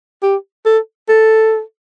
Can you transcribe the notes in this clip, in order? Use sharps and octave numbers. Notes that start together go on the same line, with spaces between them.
G4
A4
A4